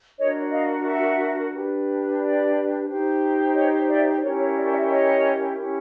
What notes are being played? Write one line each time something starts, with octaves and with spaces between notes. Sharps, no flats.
D4 F#4 A#4 C#5 D#5
D#5 F5
E5 F#5
D4 G4 B4
D5
D#4 G4 C5
C#5 D#5
D5 E5
C#4 E4 G4 A#4 C#5
C#5
D5
D5 E5
C#5 D#5
C#4 E4 G4